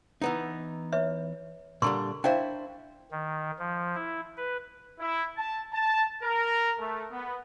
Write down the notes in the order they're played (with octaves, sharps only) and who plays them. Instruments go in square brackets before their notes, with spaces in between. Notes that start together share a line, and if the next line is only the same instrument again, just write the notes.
[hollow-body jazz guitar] E3 B3 D#4
[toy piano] B4 C#5 E5
[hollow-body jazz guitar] A#2 D3 G3 [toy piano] A#4 C6 C#6
[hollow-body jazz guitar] D4 E4 C5 [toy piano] E5 F5 G5
[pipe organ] D#3
F3
E4
B4
[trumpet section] E4
A5
A5
A#4
A3
B3